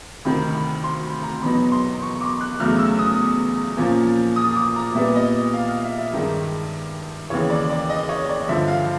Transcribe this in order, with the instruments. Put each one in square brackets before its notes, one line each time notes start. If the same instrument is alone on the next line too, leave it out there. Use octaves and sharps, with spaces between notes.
[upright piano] D2 C3 D#3 B5
B5
C6
B5
A#5
E2 B2 F#3 B3 D#4 B5
C6
C#6
D6
F#6
E2 C#3 F#3 A3 F6
E6
D#6
A#2 F3 A#3 C#4
D#6
D6
A#5
A#2 G3 B3 E5
D#5
F5
F5
E5
E5
G2 D#3 G#3
D#2 C#3 E3 C#5
D5
D5
D#5
C#5
D5
G2 D3 F3 E5
F5